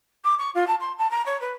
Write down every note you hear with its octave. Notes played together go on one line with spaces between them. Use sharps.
D6
C#6
F4
A5
C6
A5
A#5
C#5
B4